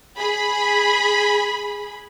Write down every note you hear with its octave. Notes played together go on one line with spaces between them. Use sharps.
G#4 B5